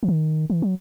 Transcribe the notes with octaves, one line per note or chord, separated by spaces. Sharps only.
E3
D#3
E3
F#3